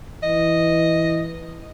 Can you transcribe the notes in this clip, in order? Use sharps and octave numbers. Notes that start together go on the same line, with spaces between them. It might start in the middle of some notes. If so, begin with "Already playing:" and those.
E3 D#5